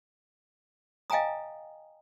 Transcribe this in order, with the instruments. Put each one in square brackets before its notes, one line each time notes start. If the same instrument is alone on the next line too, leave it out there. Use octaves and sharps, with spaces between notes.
[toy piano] D#5 F5 G5 G#5 A#5 D#6